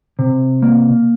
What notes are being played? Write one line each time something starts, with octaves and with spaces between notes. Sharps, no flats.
C3
A#3